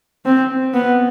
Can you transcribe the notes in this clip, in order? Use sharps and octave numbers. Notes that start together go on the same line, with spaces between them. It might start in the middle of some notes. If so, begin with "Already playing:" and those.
C4
B3